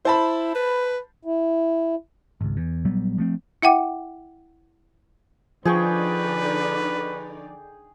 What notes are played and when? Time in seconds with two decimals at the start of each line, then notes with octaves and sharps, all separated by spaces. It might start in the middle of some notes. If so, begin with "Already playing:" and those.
0.05 E4 C5 A5 B5
0.55 B4
1.25 E4
2.41 G#1 C#2
2.57 E2
2.85 A#1 F#3 G3 B3
3.18 F3 A3 C4
3.62 E4 E5 F#5 G5 D6
5.65 D3 F3 D#4 G#4 B4 D5 G5 C#6